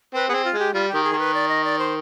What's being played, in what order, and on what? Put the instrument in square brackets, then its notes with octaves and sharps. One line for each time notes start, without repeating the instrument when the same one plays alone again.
[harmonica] C4 [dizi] B4
[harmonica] B3 [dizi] G#4
[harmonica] C4
[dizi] F4
[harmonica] G#3 [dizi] G4
[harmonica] G3 [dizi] F4
[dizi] G4
[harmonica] D#3
[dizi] G#4
[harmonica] D#3
[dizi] B4
D5
D#5
D5
C5